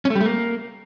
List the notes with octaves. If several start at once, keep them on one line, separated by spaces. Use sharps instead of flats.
C#4
A3
G3
A3
A#3